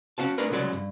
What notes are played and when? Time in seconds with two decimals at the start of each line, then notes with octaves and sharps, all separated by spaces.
0.18 C#4 F#4 F5 A5
0.38 A3 D4 G#4 A#4 B4
0.51 C2 C#3 F#3 G#3 D5
0.73 G2